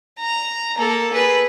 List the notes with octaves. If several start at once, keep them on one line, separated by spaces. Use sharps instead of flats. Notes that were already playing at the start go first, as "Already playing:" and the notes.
A#5
A#3 A4
G#4 B4